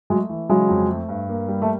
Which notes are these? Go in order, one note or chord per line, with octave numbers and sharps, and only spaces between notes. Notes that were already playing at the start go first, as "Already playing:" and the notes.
F#3 G#3 A3
E3
C#3 F#3 G#3
F2
A3
G2
A#3
G3
A3